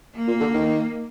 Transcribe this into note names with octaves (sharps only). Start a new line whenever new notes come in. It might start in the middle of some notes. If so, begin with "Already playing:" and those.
A#3
A#2
D3
D#3